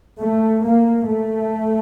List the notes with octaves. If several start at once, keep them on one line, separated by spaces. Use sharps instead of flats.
A3
A#3
A3